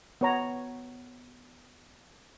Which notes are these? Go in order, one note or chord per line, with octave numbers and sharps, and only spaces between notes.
B3 C#5 A#5